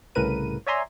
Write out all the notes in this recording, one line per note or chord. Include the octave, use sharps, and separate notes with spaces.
C2 A2 C#3 A#4 B4 D#7
C#5 D5 E5 G#5 A#5 C6